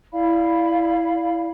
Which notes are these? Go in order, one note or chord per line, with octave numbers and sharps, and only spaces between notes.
E4 D5 F5 B5